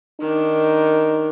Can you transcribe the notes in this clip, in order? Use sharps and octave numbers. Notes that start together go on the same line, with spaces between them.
D#3 D4 D#4